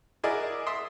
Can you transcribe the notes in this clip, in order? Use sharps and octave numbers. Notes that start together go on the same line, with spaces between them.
E4 F#4 G#4 A#4 D5 D#5
E5 C6 D#6